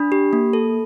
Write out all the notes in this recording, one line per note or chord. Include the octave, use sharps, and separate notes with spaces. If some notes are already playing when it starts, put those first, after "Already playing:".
Already playing: D4 B5
G4
A#3
A4